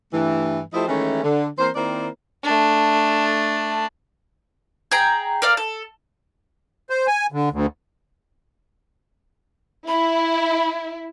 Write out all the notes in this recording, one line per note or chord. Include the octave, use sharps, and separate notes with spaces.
G2 E3 A3
F3 A3 E4 G4 C5 D#5
D#3 E3 G#3 A3 C#4
D3
E3 A#3 C4 C5
D#3 A#3 C4 E4 C5 D5
A3 D4
G#4 G5 A#5
A#4 D5 F5
A4
C5
G#5
D3
D2
E4 B5